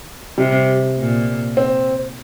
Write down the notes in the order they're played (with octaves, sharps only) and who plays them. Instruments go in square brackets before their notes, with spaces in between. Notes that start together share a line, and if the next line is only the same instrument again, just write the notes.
[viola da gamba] C3 [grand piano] G3
[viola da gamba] A#2
[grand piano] C4